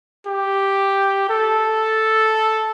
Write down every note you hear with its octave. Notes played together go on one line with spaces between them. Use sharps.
G4
A4